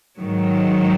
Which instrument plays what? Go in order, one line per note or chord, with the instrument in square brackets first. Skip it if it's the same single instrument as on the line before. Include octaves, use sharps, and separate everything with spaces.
[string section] G#2 D#3 F#3